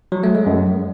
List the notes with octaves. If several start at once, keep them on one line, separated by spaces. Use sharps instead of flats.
F#3
A3
G#3
F#2